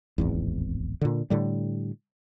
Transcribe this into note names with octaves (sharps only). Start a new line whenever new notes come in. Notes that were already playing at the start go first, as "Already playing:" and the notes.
D1 G#1 E2
A#2 D3
A2 D3 G3